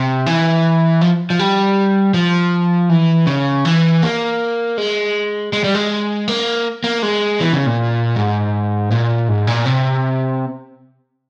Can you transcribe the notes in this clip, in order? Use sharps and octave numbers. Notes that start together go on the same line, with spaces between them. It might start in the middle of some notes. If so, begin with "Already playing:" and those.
Already playing: C3
E3
F3
F3
G3
F3
E3
C#3
E3
A#3
G#3
G#3
G3
G#3
A#3
A#3
G#3
E3
C#3
A#2
G#2
A#2
G#2
A#2
C3